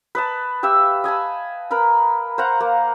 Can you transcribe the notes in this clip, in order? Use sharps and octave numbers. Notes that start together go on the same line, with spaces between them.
B4 D#5 A5
G4 E5 F5 E6
D#5 G#5 A5 B5
A#4 B4 B5
C5 F5 F#5 A#5
A#3